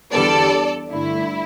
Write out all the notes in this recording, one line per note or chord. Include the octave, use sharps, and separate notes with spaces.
E2 D3 G3 B3 A4 D5
G2 D3 A3 E4